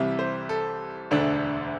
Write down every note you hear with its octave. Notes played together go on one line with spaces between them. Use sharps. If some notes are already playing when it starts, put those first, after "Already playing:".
Already playing: C2 C3 E3 G3 E5
C5
A4
E1 D2 D3 A3 D4